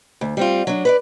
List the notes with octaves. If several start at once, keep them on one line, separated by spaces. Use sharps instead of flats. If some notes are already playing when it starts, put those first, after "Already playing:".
D2
G3 C4 F4
F#3 D4
B4 C#5 D5